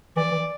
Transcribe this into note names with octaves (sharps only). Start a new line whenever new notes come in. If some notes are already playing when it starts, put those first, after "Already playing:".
E3 D5
E3